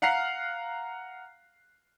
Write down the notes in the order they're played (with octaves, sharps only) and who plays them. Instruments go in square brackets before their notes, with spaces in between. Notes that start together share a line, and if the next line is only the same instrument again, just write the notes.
[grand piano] F5 F#5 A#5 F6 F#6 C7